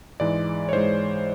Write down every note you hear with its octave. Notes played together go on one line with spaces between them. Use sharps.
G#2 E3 G#3 D5
C#5
G#2 E3 G#3 C5